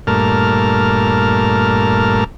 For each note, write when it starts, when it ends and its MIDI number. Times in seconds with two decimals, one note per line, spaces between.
0.07 2.24 43
0.07 2.24 46
0.07 2.24 57
0.07 2.24 70
0.07 2.24 81
0.07 2.24 89